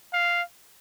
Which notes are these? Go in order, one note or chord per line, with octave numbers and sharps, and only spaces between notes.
F5